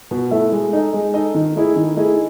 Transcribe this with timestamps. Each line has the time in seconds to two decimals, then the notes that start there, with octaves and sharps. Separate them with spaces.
0.11 B2
0.31 A3 E4 A4 E5
0.52 G#3
0.73 D#4 A4 D#5
0.94 G#3
1.14 D#4 A4 D#5
1.34 D#3
1.56 A3 E4 G#4 D#5
1.76 D#3
1.97 A3 E4 G#4 D#5